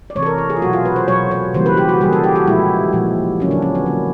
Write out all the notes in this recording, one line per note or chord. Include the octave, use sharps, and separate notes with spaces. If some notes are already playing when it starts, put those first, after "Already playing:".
D5
C3 E3 A3 C#5
A4
A#4
A4
G#4
F4
B2 F#3 A3 F#4
F4
B4
C5
B2 F#3 A3 C#5
C#5
C#3 E3 G3 A#3 C5
B4
G4
F#4
C#3 E3 G3 A#3 G#4
A4
G4
F#4
A#2 F3 G#3 E4
A#2 F3 G#3
D3 F#3 A#3 C#4
D4
C#4
B3
D3 F#3 A#3